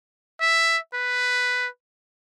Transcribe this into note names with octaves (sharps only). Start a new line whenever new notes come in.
E5
B4